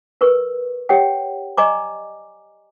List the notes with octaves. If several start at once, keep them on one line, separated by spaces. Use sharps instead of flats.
A#4 B4 C#6
G4 C#5 F#5 G5
D5 D#5 G#5 A#5 C#6 D6